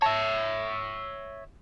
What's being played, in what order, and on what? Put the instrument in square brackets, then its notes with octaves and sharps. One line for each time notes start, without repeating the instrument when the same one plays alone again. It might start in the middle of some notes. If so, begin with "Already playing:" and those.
[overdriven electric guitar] C#5 E5 [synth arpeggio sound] A5 A#6